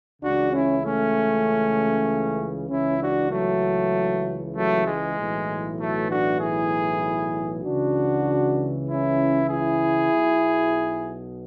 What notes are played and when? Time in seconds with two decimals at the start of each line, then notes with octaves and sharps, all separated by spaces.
0.21 C#2 C#3 E3 D4 F#4
0.52 C#4 E4
0.83 A3 C#4
2.69 C#2 C#3 E3 C#4 E4
2.99 D4 F#4
3.31 F#3 A3
4.54 F#3 A3
4.85 G#3
5.16 B1 A2 E3
5.78 F#3 A3
6.09 D4 F#4
6.40 E4 G#4
7.64 C#2 C#3 E3 D4 F#4
8.87 C#4 E4
9.49 E4 G#4
10.11 B1 B2